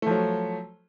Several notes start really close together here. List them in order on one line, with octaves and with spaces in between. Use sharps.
A3 F3 F#3